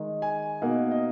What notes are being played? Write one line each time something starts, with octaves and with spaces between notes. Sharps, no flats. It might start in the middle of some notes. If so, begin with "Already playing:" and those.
Already playing: D#3 G#3 D#4
G#5
B2 A#3 D#4 F#5
D#5